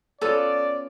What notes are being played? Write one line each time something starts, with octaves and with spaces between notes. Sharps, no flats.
B3 C#4 F4 A4 D5